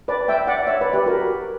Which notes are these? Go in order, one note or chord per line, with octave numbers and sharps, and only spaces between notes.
B4 D5
E5 G5
D5 F#5
C#5 E5
B4 D5
G4 B4
F#4 A#4